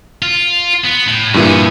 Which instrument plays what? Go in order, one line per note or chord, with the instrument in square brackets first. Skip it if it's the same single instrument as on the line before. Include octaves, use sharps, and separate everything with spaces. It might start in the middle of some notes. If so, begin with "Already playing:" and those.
[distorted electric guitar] F4
B3
A2
[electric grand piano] G2 A#2 E3 [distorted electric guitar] B3 G#4